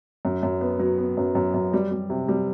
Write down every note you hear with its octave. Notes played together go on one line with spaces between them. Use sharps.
F#2
F#2
B3
F#3
B3
F#2
F#2
F#2
G3
G3
C3
G3